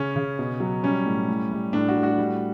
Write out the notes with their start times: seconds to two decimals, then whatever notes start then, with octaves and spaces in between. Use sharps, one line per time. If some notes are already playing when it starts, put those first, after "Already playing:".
Already playing: C#3 C#4
0.16 C#3
0.39 B2
0.60 F#3
0.83 G3 C#4
1.06 A2
1.28 A2
1.51 G3
1.73 A2 D4
1.88 F#4
1.96 A2
2.03 F#4
2.18 G3